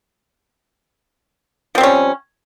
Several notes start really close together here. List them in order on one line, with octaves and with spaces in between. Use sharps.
F3 C4 G3 C#4